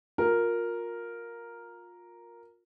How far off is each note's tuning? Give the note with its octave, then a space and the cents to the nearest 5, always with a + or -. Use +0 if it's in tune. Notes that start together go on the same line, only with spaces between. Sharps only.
F4 +30 A#4 +0